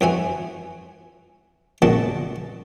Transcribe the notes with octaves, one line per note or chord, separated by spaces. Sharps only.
F2 E3 F#4 G#5
C#2 A#2 F#4 D#5 A5